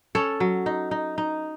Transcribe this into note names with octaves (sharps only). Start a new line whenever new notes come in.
C#4 A4 C#5
F#3
D#4
D#4
D#4